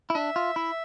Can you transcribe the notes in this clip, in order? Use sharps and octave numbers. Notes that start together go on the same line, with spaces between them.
E4
D4 E5
F4
E4